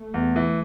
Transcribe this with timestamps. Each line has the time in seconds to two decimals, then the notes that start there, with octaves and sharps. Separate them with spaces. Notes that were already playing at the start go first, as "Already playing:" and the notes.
Already playing: A3
0.14 E2
0.36 E3